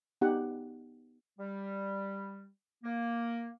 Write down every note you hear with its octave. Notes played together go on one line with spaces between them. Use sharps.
B3 D#4 G4 F#5
G3
A#3